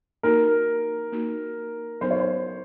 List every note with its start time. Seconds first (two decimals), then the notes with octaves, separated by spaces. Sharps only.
0.23 A#3 D#4 F#4 A#4
1.12 A#3 D#4 F#4
2.01 F#3 B3 D#4 C5
2.11 C#5
2.20 C5